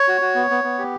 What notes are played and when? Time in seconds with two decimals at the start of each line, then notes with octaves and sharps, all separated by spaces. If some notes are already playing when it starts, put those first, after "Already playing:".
Already playing: C#5
0.08 F#4
0.21 F#4
0.35 B3
0.50 B3
0.64 B3
0.79 G4